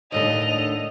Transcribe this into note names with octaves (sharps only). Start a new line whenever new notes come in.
D#2 A2 D3 D#5 F7